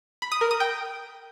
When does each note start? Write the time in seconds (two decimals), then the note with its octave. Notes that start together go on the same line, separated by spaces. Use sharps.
0.22 B5
0.32 D#6
0.41 A#4
0.51 D#6
0.60 G5